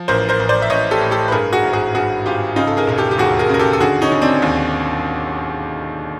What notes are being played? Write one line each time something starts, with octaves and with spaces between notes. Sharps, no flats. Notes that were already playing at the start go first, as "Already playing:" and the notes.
Already playing: F3
A1 A#4 C5
A#4 C5
A1
C5 D5
E5
A1 C#5 D#5
G4 A4
A2
G4 A4
B4
G2 G#4 A#4
F#4 G#4
G#1
F#4 G#4
G2 F#4 G#4
G#1 F4 G4
C#3 D#4 F4
A4
G#4 A#4
E1 A#4
G4 A4
G4
D#2 F#4 G#4
G#4 A#4
C#3 A#4
G4 A4
A4
D3 F#4 G#4
C#4 D#4
D3
C4 D4
D#2